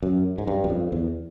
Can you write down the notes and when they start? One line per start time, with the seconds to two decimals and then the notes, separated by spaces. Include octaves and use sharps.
0.03 F#2
0.38 G#2
0.47 G2
0.64 F#2
0.70 F2
0.92 E2